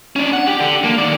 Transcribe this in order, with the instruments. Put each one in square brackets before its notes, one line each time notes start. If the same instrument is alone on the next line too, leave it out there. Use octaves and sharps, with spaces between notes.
[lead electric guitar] C#4 D4
F#5
G4
D3
A#3
D#3 D5